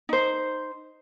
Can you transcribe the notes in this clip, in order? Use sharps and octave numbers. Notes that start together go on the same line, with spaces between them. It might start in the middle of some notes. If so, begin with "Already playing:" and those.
D#4 C5